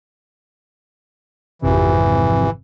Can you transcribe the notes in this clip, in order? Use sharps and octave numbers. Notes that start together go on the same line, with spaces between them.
G#1 F2 C3 E3